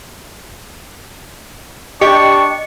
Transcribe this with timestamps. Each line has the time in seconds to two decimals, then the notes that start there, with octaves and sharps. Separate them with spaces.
2.01 D4 G4 D#5 C#6 C#7